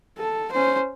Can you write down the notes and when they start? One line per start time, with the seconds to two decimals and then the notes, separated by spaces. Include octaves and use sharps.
0.18 A4
0.52 C#4 C5